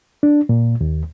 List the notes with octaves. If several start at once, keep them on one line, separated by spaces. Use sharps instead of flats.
D4
A#2
D#2